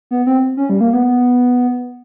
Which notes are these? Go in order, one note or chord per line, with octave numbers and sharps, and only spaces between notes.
B3
C4
C#4
G3
A#3
B3